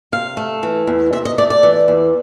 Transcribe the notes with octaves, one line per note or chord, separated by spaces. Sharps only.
C3 F5
A3
E3
E2
C3 E5
D#5
A3 D5
D5
E3
E2